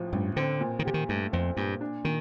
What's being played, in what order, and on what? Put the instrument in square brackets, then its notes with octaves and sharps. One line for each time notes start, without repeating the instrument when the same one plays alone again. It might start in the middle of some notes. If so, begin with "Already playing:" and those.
Already playing: [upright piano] A1 A2 F3
[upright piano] A1 [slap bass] G2
[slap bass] D3 [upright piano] C4
[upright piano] A#2
[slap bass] D#3
[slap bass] D3 [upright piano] G4
[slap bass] D#3
[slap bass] G2 [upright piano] A3
[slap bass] F2 [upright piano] C4
[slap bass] G2 [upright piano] A#2
[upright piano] D4
[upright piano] A#2 [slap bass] D#3